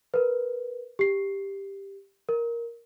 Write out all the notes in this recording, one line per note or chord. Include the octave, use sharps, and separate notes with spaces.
A#4 B4
G4 C7
A#4